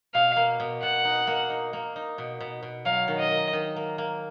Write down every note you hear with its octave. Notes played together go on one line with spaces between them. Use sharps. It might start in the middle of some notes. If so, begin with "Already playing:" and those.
B2 F5
A#3
B2
B2 F#5
D#4
A#3
D#4
A#3
D#4
B2
B2
B2
F#3 F5
D#3
D#5
A#3
D#3
A#3
A#3